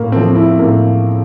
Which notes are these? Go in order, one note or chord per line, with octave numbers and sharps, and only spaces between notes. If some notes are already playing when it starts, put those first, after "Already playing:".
Already playing: A2 A#3
F3 A3 C4
E4
A2 A#3